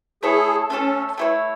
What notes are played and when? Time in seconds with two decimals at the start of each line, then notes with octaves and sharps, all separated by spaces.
0.23 A3 E4 G#4 A4 C#5
0.70 A3 C#4 E4 A4 C#5
1.18 A3 E4 A4 C#5